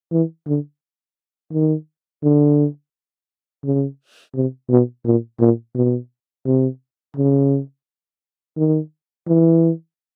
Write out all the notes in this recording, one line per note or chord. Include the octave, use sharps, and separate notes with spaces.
E3
D3
D#3
D3
C#3
C3
B2
A#2
A#2
B2
C3
C#3
D#3
E3